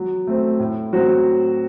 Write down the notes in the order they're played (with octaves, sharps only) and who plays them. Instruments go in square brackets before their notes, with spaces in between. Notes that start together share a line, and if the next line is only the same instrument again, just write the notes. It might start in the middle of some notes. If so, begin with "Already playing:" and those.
Already playing: [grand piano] F#3
A3 C4
A2
F#3 C4 F#4